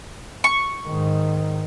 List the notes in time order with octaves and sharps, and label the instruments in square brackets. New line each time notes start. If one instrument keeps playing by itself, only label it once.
[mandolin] C#6
[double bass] G#2 D#3